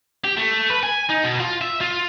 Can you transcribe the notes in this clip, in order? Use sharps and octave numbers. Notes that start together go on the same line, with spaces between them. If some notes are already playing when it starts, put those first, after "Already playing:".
G4
A3
B4
G#5
D#4
B2
F4
E5
F4